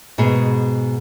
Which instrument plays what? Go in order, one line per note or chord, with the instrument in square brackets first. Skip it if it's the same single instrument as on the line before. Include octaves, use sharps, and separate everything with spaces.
[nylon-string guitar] G#2 B2 G#4